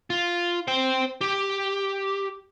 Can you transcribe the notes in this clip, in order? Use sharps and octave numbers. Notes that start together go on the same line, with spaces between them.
F4
C5 G5
G4